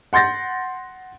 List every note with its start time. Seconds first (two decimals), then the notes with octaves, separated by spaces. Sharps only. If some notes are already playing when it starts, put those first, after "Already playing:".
0.13 F#5 C6 G6 A6 A#6